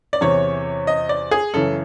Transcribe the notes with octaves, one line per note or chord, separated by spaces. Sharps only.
D5
E2 C3 E3 C#5
D#5
D5
G#4
F#2 C#3 E3 A4